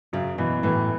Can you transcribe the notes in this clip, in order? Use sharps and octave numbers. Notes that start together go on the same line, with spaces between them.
F#2 C#3
B2 E3
A2 E3